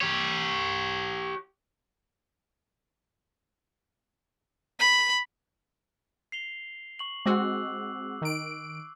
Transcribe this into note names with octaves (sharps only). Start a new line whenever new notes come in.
G4 C#5
B5
C7 F7 G7
C#6 F#7
G#3 C4 F#4 D6 E6 F#6
D#3 D7